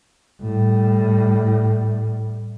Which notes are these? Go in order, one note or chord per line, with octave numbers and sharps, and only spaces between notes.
A2 G3